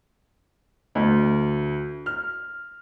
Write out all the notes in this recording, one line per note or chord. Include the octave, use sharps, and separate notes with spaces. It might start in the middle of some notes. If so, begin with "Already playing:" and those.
D2
F6